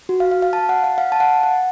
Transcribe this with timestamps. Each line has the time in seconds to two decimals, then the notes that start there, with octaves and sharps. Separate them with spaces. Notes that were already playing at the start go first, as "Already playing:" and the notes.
0.09 F#4
0.20 F5
0.31 F5
0.42 F5
0.53 A5
0.69 F#5
0.84 F#5
0.98 F5
1.12 A5
1.20 F#5
1.43 F#5